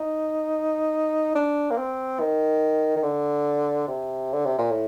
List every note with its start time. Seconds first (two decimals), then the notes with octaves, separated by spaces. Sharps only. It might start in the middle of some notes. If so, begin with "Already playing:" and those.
Already playing: D#4
1.35 D4
1.70 A#3
1.78 C4
2.20 D#3
2.96 D#3
3.03 D3
3.88 C3
4.33 D3
4.45 C3
4.59 A#2
4.71 A2